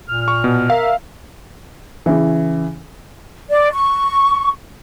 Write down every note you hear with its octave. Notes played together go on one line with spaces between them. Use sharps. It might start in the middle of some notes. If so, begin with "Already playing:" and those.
A#2 F6
C#6
B2
A#4 E5 F5
C#3 E3
D5
C#6